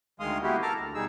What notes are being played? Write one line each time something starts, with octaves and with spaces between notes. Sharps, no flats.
D2 D#3 G#3 F5 C6 D#6
G#3 A#3 B3 E4 F#4 G4
A4 A#4 A5 A#5 D6 F6
D2
B2 G3 D#4 G#4 E6